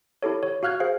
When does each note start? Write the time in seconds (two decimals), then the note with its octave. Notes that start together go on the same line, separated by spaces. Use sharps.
0.22 E4 G4 A4 C#5
0.43 C#5
0.63 F#4 F5 F6 F#6 G#6
0.80 G#4 C5 F5